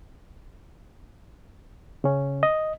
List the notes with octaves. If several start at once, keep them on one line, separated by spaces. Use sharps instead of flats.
C#3 C#4
D#5